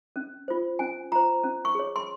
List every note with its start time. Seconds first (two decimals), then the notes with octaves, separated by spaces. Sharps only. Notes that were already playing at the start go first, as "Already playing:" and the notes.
0.16 C#4
0.48 F4 C5
0.79 C#4 G#5
1.12 F4 C5 A#5
1.43 C#4
1.65 C#6
1.75 G#4 C#5
1.96 C6